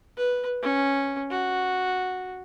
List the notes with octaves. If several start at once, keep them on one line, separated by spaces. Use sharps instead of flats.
B4
C#4
F#4